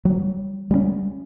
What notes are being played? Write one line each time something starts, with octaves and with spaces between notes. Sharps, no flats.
F#3 G3
G3 G#3 B3 C#4